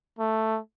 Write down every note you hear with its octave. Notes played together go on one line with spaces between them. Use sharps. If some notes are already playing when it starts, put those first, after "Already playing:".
A3